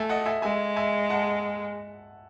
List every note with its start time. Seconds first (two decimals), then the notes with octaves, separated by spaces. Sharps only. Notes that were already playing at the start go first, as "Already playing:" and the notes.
Already playing: A3 E5 G#5
0.09 D#5 F#5
0.26 E5 G#5
0.42 G#3 E5 G#5
0.76 E5 G#5
1.09 F#5 A5